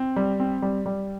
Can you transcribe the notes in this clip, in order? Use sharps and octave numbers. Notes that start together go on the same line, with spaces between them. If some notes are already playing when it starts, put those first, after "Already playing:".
Already playing: C4
G3
C4
G3
G3